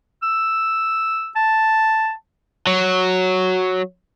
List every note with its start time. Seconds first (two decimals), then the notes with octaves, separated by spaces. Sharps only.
0.23 E6
1.36 A5
2.67 F#3